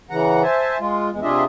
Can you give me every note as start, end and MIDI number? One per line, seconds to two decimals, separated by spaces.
0.10 0.43 49
0.10 0.43 52
0.10 0.43 78
0.10 0.43 82
0.43 0.78 72
0.43 0.78 76
0.43 0.78 80
0.43 0.78 81
0.80 1.10 56
0.80 1.10 65
1.11 1.20 40
1.11 1.20 56
1.23 1.44 48
1.23 1.44 62
1.23 1.44 65
1.23 1.44 68
1.23 1.44 75
1.23 1.44 76